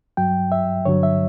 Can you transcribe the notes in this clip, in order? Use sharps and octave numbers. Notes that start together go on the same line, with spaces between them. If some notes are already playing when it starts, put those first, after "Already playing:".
G2 F#3 G5
E5
G2 D3 F#3 C#5
E5